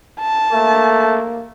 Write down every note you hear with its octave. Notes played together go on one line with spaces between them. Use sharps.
A5
A3 A#3